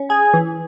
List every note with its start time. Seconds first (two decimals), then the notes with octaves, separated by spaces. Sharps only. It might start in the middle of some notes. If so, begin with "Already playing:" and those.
Already playing: C#4
0.10 G#4 G#5
0.34 E3